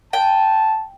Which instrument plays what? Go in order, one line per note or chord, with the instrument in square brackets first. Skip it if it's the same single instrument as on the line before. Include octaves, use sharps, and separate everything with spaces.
[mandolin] G5 [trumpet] A5